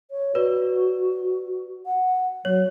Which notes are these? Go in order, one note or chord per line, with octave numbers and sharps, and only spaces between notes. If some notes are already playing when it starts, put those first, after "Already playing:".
C#5
F#4 B4 D5
F#5
F#3 C#5